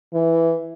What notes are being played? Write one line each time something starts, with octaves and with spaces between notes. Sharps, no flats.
E3